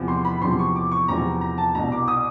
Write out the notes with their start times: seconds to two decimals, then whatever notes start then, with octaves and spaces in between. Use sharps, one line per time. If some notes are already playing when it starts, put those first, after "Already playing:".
Already playing: E2 C3 F3
0.08 C6
0.25 B5
0.42 E2 C3 F3 C6
0.59 C#6
0.76 D6
0.92 C#6
1.08 E2 C3 F3 A#5
1.41 A#5
1.58 A5
1.75 C2 B2 A#5
1.92 D6
2.08 D#6